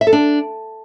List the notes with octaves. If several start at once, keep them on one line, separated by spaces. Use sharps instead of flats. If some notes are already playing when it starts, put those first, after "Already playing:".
E5
A4
D4